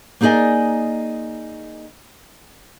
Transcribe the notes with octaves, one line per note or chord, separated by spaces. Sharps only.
A#3 D#4 G#4 D5 D#5 G#5